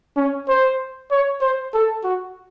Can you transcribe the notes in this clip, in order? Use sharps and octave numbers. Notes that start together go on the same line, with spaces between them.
C#4
C5
C#5
C5
A4
F#4